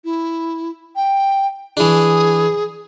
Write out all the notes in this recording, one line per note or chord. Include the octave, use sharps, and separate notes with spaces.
E4
G5
E3 D4 G#4